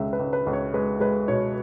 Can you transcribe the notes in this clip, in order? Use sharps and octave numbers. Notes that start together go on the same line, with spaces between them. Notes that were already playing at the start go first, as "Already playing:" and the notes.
Already playing: C#2 B2 G#3 E5
B4
C#2
B4
C#2
C#5
G#3 B4
G#3 B4
B2 C#5